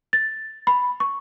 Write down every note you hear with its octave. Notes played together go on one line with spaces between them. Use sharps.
A6
B5
C#6